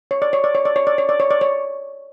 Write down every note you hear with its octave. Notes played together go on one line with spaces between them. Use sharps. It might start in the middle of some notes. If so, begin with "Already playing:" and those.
C#5
D5
C#5
D5
C#5
D5
C#5
D5
C#5
D5
C#5
D5
C#5